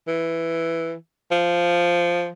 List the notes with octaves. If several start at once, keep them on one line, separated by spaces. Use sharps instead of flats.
E3
F3